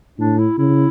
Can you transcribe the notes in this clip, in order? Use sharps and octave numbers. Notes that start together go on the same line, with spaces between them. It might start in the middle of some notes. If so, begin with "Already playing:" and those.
A2 D4
E4
C#3 E4